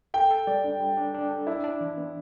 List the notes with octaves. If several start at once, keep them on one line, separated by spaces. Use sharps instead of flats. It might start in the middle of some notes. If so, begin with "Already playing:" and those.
A4 G5
A4
G3 D5
D4
G3
D4
D4
A4
D4 E4
D4
E3
B3